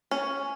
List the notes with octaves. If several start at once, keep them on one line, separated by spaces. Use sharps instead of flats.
C#4